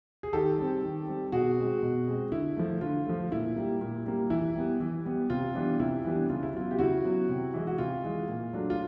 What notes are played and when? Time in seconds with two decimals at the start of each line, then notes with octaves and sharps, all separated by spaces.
0.23 G#4
0.33 D#3 G4 A4
0.58 G3 C4
0.83 D#3
1.08 G3 C4
1.32 B2 F#4 G#4
1.57 G#3 C4
1.83 B2
2.08 G#3 C4
2.32 D3 E4
2.57 F3 A3
2.81 D3 F4
3.07 F3 A3
3.31 A#2 E4
3.56 G3 A#3
3.81 A#2
4.06 G3 A#3
4.30 E3 E4
4.55 G3 B3
4.80 E3
5.05 G3 B3
5.30 C3 F4
5.55 E3 G3 B3 D4
5.80 C3 E4
6.05 E3 G3 B3 D4
6.29 C#3 F4
6.43 E4
6.55 F#3 B3 F4
6.71 G4
6.79 C#3 E4 F#4
7.04 F#3 B3
7.29 C3
7.54 E3 G#3
7.67 F#4
7.78 C3 F4
8.04 E3 G#3
8.28 A#2
8.53 F#3 A3 D4
8.70 F4